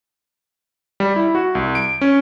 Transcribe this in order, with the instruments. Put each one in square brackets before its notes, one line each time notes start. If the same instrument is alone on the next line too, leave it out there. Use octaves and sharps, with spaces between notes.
[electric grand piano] G3
E4
F#4
C2
D7
C#4